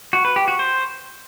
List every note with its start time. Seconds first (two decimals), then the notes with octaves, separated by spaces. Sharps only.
0.13 F#4
0.25 B4
0.36 G4
0.48 F#4
0.59 C5